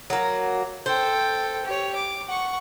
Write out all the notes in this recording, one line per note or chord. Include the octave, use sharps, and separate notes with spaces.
F#3 A#3
A4 C5 G5
G4 C#5
D6
F#5 C#6